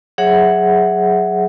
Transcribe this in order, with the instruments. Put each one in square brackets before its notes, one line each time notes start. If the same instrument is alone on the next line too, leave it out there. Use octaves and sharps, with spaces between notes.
[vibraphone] F#3 G#4 C#5 E5 F#5